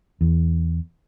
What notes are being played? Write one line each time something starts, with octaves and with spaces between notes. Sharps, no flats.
E2